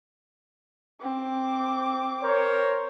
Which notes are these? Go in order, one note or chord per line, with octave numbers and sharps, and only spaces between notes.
C4 D6
A#4 C5 C#5